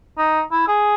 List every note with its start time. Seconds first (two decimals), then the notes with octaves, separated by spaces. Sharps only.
0.18 D#4
0.52 E4
0.68 G#4